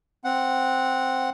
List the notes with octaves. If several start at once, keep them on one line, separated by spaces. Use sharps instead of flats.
C4 F#5